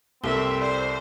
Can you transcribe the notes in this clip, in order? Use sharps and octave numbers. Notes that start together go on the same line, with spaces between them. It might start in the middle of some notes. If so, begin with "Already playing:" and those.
C2 C4 A4 A#4 E5 G7
C5 D5